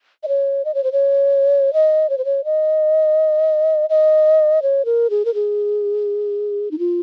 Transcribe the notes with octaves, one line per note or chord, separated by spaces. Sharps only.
D#5
C#5
D#5
C#5
C5
C#5
D#5
C#5
C5
C#5
D#5
D#5
C#5
A#4
G#4
A#4
G#4
D#4
F4